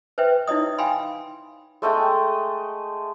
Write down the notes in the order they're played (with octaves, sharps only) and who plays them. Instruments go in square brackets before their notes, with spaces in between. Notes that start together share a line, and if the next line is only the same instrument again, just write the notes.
[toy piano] B4 C5 E5 G5
D#4 E4 C#5 D#5 D#6
F5 G5 G#5 B5 C6
[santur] G#3 A3 D#5 G5